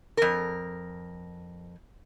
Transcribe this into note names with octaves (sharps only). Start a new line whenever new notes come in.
F2 A#4